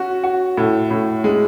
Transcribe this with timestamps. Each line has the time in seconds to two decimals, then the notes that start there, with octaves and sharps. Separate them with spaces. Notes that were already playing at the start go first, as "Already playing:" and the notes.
Already playing: C#4 F#4
0.24 F#4
0.57 A2
0.91 A2
1.24 G#3